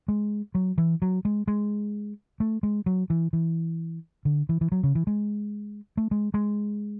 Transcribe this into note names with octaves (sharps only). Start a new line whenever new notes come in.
G#3
F#3
E3
F#3
G#3
G#3
A3
G#3
F#3
E3
E3
D3
E3
E3
F#3
C#3
E3
G#3
A3
G#3
G#3